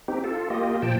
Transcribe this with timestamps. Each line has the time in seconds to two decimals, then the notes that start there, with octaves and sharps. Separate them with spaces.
0.08 C4 D#4 G4
0.24 F4 A4
0.50 A#3 F4 G4 D#5
0.82 A#2 F3 G5 A5